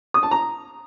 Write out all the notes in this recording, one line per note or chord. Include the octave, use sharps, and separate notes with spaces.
D#6
A5
A#5